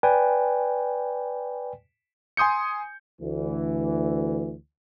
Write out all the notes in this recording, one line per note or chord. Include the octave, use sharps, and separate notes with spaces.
B4 D5 G5 G#5
G#5 C6 D#6 G6 C#7
D2 E3